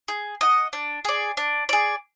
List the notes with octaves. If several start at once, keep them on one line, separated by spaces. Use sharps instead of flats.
G#4
D#5 F#5
D4
G#4 D5
D4
G#4 D5